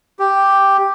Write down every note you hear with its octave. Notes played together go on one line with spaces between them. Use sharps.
G4